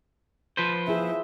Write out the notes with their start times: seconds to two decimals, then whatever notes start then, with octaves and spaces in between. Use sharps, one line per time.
0.57 F3 B4 C5
0.88 E4 F4 G#4 E5